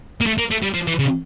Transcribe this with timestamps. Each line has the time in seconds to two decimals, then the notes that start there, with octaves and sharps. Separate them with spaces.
0.21 A#3
0.26 A3
0.38 A#3
0.51 A3
0.63 G3
0.74 F3
0.87 E3
0.99 C#3